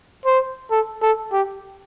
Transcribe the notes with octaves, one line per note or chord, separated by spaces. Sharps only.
C5
A4
A4
G4